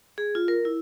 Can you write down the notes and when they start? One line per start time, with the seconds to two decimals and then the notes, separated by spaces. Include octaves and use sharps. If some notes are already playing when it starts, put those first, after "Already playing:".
0.18 G#4
0.35 F4
0.48 A#4
0.65 E4